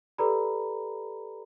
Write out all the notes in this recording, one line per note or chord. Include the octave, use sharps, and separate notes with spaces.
G4 A4 B4 D5 A#5 B5